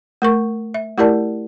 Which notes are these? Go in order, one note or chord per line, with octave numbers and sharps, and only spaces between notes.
A3 A#4 C#6
E5
A3 E4 G4 A#4 D5 A5